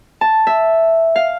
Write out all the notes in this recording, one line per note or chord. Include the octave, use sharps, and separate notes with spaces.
A5
E5
F5